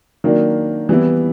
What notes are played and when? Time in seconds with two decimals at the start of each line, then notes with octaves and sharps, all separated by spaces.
0.24 D#3 F#3 A#3 D4
0.89 E3 G3 B3 E4